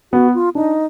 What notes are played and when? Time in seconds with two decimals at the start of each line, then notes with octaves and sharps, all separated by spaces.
0.12 B3 F#4
0.34 F4
0.55 D4 D#4